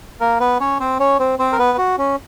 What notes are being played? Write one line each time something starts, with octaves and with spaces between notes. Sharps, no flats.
A#3 A#4
B3 B4
C#4 C#5
C4 C5
C#4 C#5
C4 C5
C4 C5
A#4
B3 B4
F#4
C#4